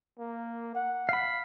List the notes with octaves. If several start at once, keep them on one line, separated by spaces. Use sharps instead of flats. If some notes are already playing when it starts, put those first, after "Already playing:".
A#3
F#5
F5 B5